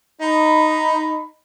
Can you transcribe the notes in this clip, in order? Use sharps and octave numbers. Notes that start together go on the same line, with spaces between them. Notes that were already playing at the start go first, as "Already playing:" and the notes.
D#4 B5